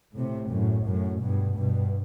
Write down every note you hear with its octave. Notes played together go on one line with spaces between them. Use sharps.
A2 C3
F#2 A2
F#2 A2
G2 B2
G2 B2